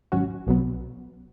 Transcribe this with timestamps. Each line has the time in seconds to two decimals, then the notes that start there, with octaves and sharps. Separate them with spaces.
0.12 G#1 G#2 F#3 C#4 F#4
0.47 B1 B2 F#3 B3